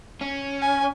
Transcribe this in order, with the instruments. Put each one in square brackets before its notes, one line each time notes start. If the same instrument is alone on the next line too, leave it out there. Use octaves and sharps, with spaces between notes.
[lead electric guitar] C#4
[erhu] G#5